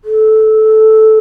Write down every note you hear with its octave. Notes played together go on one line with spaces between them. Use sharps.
A4